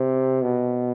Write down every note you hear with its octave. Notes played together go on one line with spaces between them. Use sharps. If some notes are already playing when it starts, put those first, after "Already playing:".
Already playing: C3
B2